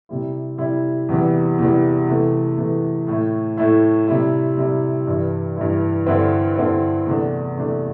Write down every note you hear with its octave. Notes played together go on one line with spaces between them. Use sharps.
C3 G3 E4
C3 G3 E4
E2 C3 E3 G3
E2 C3 E3 G3
C3 E3 A3
C3 E3 A3
A2 A3 E4
A2 A3 E4
C3 G3 E4
C3 G3 E4
G2 E3 G3 E4
G2 E3 G3 E4
G2 D3 C4 E4
G2 D3 C4 E4
E2 C3 A3 D4
E2 C3 A3 D4